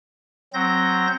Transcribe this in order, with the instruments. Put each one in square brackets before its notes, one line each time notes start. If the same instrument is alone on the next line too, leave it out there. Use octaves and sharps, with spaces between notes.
[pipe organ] F#3 C4 G6 A#6